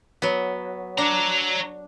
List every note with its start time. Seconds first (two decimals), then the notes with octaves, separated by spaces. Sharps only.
0.22 F#3 B3
0.98 D4 C#5 A#5